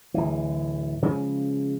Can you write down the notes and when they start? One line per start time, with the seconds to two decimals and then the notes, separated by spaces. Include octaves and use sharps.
0.14 D1 E3
1.02 C#3 F3 G#3